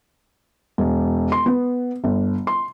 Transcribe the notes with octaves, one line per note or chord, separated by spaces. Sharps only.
E1
C6
B3
G1
C6